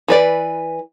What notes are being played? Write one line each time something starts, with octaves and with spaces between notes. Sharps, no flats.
E3 B4 D5